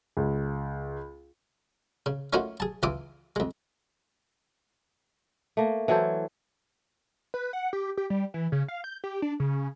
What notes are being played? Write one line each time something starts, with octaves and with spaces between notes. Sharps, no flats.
C#2
C#3
A3 A#3 C#4 D#4 F4 F#4
G#4 A5
C#2 E3 F4 D6 D#6
F2 G#3
A3 A#3
E3 F#3 A4 C5
B4
F#5
G4
G4
G3
E3
C#3
F5
G6
G4
D4
C#3